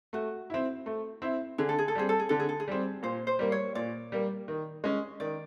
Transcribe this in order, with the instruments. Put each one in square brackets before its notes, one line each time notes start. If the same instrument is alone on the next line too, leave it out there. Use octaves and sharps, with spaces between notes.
[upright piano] A3 [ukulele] F#4
[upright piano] C4 E4
A3
C4 E4
[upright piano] D3 [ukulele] G#4
[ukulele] A4
G#4
A4
[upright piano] G3 C4 [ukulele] G#4
[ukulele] A4
G#4
[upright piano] D3 [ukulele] A4
[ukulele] G#4
A4
G#4
[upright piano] G3 C4
[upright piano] A#2 [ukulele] C5
[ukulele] C5
[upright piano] G3 A#3
[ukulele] C#5
[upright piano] A#2 [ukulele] D5
[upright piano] G3 A#3
D#3
G#3 C#4
[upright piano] D#3 [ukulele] D5